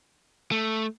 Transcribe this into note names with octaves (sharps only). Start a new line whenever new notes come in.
A3